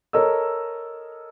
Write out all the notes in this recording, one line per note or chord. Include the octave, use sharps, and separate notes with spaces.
A4 A#4 C#5 D#5 E6